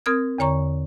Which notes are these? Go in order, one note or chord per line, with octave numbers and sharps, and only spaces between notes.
C4 A#4 D#6 F6 G#6
E2 D3 C#5 A#5 C#6